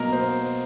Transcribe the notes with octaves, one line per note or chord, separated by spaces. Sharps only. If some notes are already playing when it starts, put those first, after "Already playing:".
Already playing: B2 F#3 A#3 A#4 D#5
C5